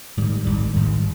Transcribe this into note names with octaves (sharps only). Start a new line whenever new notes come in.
G#1 G#2 D#3 G3
G#1 G#2 D#3 G3
G#1 G#2 D#3 G3